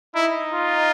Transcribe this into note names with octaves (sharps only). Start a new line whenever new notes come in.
D#4 E4
F4